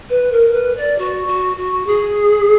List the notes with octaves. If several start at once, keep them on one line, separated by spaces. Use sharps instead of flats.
B4
A#4
B4
D5
F#4
F#4
F#4
G#4